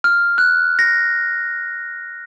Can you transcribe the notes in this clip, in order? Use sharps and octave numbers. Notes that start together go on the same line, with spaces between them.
F6
F#6
A#6